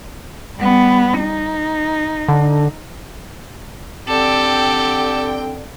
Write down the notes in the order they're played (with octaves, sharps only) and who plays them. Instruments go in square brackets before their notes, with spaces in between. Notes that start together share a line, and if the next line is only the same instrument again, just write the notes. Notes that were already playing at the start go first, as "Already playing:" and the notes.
[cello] G3 B3
D#4
[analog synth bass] D3
[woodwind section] D3 C4 [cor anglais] G4 [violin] A4 [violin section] G5